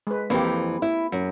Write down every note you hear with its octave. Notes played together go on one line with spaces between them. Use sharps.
G#3 B4
F2 E3 A#3 C4 G4
E4
F#2